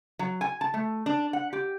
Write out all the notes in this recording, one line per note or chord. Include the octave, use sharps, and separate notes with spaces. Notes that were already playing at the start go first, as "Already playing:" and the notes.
F#3
G#5
A5
A3
D4
F#5
G4